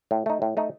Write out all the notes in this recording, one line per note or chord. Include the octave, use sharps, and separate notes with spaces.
A2
A3 D#4
A2
A3 D#4